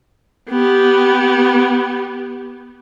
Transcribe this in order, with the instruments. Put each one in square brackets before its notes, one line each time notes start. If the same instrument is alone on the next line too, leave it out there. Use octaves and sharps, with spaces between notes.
[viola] B3 G4